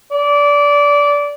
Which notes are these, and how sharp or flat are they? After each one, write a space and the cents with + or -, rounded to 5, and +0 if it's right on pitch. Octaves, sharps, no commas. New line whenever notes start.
D5 -20